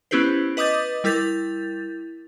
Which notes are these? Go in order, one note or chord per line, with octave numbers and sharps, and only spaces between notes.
B3 C#4 E4 G4 B4 C5
B4 D#5 D6 D#6 G6 A6
G3 E4 A#4 G6 A6